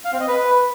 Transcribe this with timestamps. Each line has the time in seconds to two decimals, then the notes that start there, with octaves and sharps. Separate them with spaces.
0.05 F5
0.12 C4
0.20 D#5
0.28 B4